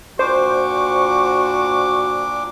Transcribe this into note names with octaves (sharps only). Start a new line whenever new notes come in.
A#2 D4 F#4 C5 C#6 D6